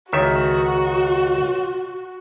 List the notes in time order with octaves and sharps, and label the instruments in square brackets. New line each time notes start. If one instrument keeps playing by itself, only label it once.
[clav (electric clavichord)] C#2 D#3 E5 [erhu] F#4